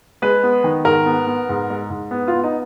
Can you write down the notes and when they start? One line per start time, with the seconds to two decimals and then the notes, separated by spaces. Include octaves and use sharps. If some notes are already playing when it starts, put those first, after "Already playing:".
0.22 G#3 B4
0.43 B3
0.64 D#3
0.85 G#2 A#4
1.06 B3
1.27 B3
1.49 G#2
1.70 G#3
1.90 G#2
2.11 B3
2.28 B3 F4
2.44 D#4